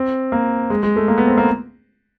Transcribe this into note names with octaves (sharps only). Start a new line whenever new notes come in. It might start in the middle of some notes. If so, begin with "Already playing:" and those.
Already playing: C4
A#3
G#3
G#3
A3
A#3
B3
C4
A#3